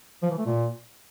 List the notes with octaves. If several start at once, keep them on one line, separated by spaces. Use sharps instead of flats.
F3
E3
A3
A#2